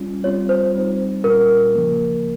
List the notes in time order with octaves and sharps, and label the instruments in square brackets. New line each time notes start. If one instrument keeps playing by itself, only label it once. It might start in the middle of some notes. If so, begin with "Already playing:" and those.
Already playing: [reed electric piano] G3 C#4 F4
[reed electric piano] G3 C4 F4 [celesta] C#5
[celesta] C5
[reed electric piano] G3 C4 D#4
[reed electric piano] A#2 G3 C#4 F4 [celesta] A#4
[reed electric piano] C#3 F3 A#3